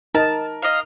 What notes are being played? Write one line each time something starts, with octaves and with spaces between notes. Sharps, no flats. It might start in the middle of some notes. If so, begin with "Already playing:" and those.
D#4 A#4 A5
D#5 F5